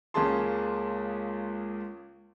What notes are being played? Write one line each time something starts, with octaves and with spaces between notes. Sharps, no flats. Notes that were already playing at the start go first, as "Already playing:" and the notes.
C#2 A#3 C#4 G#4 A5 C6